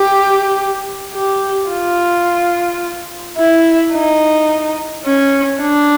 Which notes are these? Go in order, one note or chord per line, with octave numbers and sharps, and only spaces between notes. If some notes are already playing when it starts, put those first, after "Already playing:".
Already playing: G4
G4
F4
E4
D#4
C#4
D4